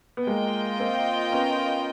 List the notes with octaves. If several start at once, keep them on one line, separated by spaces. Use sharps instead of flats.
B3
G#3 A#3 F4 A#4 D#5 G5
A#3 C4
B3 C#4